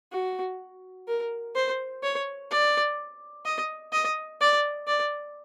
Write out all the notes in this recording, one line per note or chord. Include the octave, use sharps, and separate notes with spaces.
F#4
A#4
C5
C#5
D5
D#5
D#5
D5
D5